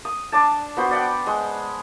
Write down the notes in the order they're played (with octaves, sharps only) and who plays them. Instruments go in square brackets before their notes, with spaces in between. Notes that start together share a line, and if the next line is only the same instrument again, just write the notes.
[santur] D#6
D4 D5 A5
B3 F#4 C5
D5 F#5 G5
G#3